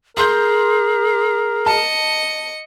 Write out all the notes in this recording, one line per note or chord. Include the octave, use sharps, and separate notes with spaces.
G#4 A#4 C6 G6
D#5 A5 C#7